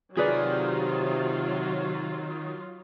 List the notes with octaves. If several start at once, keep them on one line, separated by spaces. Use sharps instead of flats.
C3 D#3 F#3 F4 G#4 B4 D5